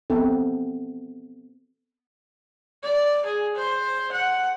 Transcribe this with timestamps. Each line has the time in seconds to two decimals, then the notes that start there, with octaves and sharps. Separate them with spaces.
0.10 B3 C4 A4
2.83 D5
3.26 G#4
3.56 C5
4.12 F#5